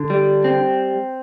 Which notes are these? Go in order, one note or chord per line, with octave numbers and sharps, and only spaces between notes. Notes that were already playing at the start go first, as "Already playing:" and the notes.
Already playing: D3
G3
C4